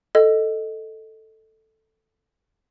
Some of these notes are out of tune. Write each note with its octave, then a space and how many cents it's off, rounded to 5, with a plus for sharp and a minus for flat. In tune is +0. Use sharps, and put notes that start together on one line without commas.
A4 +0 D#5 +0